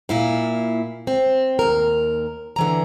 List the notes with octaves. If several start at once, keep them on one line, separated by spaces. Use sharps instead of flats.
A#2 E4 F5
C4
D#2 A#4
D3 E3 A#5